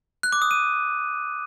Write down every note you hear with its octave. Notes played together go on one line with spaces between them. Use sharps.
F#6
D6
D#6
D#7